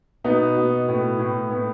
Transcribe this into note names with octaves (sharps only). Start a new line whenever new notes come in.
B2 B3 D#4
B2
A2 B3
A2
A2 B3